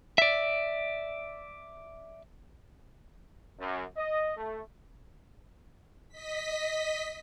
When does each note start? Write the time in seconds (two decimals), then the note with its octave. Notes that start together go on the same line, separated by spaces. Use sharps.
0.18 D5 E5
3.58 F#2
3.97 D#5
4.36 A3
6.09 D#5 B6